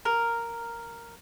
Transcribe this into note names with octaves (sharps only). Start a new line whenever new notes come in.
A#4